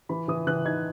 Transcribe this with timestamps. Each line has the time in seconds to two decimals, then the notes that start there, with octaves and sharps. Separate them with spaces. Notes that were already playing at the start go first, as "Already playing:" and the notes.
0.09 E3 B5
0.28 E3 D#6
0.47 E3 F#6
0.65 D#4 G#6